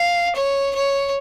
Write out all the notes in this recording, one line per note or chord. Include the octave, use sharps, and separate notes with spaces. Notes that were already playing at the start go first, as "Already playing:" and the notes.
Already playing: F5
C#5
C#5